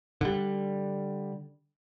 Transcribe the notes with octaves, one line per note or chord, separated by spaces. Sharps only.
D3 G3